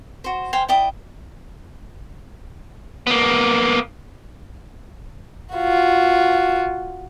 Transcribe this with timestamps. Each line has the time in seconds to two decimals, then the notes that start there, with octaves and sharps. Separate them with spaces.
0.24 F#4 C5
0.53 C5 F5 G5 G#5
0.69 E4 D5 G5 D#6
3.07 A#3 B3
5.55 F4 F#4